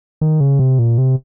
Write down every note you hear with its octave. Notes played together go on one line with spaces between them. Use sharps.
D#3
C#3
C3
A#2
C3